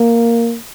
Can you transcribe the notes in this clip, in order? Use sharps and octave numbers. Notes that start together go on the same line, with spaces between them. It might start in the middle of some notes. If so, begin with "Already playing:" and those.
Already playing: A#3